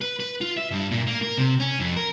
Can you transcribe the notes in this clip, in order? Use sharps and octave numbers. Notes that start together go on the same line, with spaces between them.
B4
B4
F4
E5
G2
A#2
A#3
A#4
C3
C#4
F2
A#4